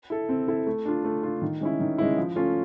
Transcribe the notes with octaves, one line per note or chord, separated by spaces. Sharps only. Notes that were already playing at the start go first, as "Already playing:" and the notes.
E4 A4
C4
E4 A4
A3
D4 F4
A3
D4 F4
D#3
G#3 C#4 E4
D#3
G#3 C#4 E4
F3
A3 C#4 F4